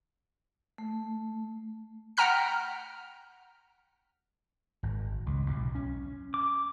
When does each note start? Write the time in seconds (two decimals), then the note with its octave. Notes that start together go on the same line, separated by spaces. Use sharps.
0.78 A3
2.17 F#5 G5 A#5 F6 B6
4.83 G#1
5.26 C#2
5.46 B1
5.75 C#4
6.34 D6